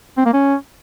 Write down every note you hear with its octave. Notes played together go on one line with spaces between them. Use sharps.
C4
A#3
C#4